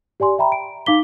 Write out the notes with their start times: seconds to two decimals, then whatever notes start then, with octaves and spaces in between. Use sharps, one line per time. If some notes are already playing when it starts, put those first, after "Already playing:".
0.20 G4 D5 G#5 C6
0.39 E5 G5 A#5 B5
0.52 D7
0.86 D#4 F5 D6 B6 G7